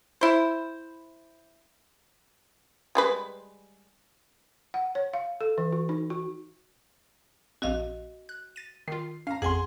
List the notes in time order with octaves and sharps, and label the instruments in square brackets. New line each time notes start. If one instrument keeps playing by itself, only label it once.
[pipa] E4 C5
[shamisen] G3 G#3 B4
[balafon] F#5
C#5
F5
A4
E3
F#4
D#4
F#4
[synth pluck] A#1 C4 [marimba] F#4 D#5 F5
[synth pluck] F#6
A6 D#7
[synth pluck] D#3 F4 [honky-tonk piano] C7
[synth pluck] C#4 [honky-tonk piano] F5 A#5
[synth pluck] A1 F2 [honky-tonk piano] G#4 C6 [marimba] F#5 G#5